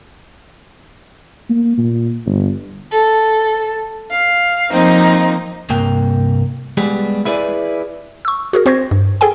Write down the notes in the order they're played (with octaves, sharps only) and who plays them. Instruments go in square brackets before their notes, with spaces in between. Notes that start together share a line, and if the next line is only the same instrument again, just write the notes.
[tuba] A#3
A#2
G1
[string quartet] A4
F5
F3 A#3 C4 D#4
[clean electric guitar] C2 G2 A#3 G5
G3 G#3 B3 G4 G#4
E4 G#4 B4 D5
[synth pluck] C#6 E6
F#4 G#4 A#4
C4 C5 C#6 G#6 A#6
G2
G#4 A4 G5 G#5